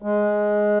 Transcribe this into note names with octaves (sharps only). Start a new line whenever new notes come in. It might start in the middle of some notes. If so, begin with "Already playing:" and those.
G#3